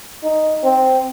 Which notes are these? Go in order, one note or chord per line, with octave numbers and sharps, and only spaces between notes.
D#4
C4